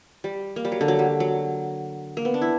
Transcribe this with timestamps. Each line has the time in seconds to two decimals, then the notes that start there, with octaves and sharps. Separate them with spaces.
0.24 G3
0.56 A#3
0.65 G3
0.72 F#3
0.81 D3
0.88 F#3
0.99 G3
1.20 F#3
2.17 A#3
2.25 B3
2.34 D4
2.42 E4